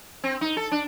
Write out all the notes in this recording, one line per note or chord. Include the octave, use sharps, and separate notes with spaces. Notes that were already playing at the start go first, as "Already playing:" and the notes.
C4
D#4
A4
D4